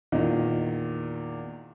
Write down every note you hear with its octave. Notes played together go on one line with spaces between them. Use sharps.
E2 A#2 D#3 D#5